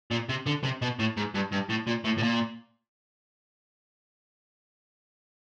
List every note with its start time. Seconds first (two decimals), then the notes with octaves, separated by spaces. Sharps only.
0.11 A#2
0.29 C3
0.46 D3
0.64 C3
0.82 B2
1.00 A2
1.17 G#2
1.35 G2
1.52 G2
1.70 A2
1.87 A#2
2.05 A2
2.18 A2
2.23 A#2